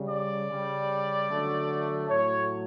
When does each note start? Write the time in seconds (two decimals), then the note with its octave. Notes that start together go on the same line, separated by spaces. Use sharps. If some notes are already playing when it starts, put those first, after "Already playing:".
Already playing: C#3 G3
0.09 D5
0.49 C#3 G3
1.29 D3 F#3 A3
2.10 A2 F#3 A3 C#5